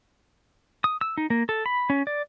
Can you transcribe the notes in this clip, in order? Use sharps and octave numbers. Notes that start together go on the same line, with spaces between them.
D#6
E6
D#4
A#3
A4
B5
C#4
D5